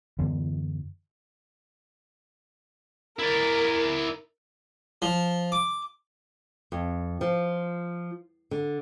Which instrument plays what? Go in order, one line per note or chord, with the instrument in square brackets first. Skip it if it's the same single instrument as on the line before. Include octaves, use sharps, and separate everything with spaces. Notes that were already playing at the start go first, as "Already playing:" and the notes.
[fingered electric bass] F#2 D3 E3 B3
[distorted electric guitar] E4 D5 [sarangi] A#4
[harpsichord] F3
D6
[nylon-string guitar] F2
F3
D3